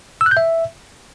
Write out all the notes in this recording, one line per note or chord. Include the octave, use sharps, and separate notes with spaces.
E6
F#6
G6
E5